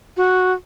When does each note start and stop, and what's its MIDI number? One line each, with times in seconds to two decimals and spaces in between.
0.17 0.52 66